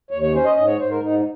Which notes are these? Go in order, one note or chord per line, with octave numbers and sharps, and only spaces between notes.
D#2 C#5
C#5
C#4 C5
D#5
G#2 D#5
C#5
G#2 C5
A#4
G#2 D#4
D#4